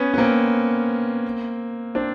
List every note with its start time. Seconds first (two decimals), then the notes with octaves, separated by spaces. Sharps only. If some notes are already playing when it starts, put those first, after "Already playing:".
Already playing: B3 C#4
0.14 B3
0.18 A#3 C4
1.95 C4 D4